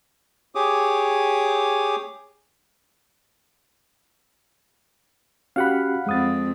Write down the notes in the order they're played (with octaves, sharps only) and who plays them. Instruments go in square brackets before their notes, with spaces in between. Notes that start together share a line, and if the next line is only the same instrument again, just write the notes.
[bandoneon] G4 G#4 C#5 D6 D#6
[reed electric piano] C#4 F#4 G4 [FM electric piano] F5 F#5 B5
[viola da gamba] F2 C4 [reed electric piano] G#3 D#6 A6